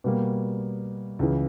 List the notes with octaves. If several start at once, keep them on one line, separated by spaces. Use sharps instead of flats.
B2 G3 A#3
C#2 C#3 E3